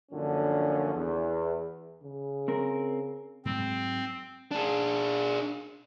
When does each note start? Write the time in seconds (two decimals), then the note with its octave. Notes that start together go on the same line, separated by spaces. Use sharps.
0.11 F#2 A#2 D3 F3 C#4 D4
0.94 E2
2.03 C#3
2.48 C4 A#4
3.45 G#2 F#3 G#3 C4
4.51 D4 G#4